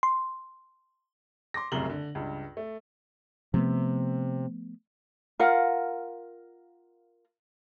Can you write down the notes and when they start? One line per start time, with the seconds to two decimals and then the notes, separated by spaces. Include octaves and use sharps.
0.03 C6
1.54 C6 D6 A#6
1.72 F1 C2 F#2 C#3 F#7 G7
1.90 D3
2.15 C#2 G2
2.57 A3
3.54 C3 F3 A3 B3
5.40 F4 A#4 F5 F#5